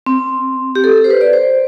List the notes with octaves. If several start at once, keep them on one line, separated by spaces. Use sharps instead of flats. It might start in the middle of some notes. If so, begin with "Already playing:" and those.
C4
G4
A4
G4
C5
B4
D5
C5